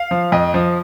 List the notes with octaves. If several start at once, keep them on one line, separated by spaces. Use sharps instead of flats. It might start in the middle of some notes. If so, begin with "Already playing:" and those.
Already playing: F5
F3
F2 D#5
F3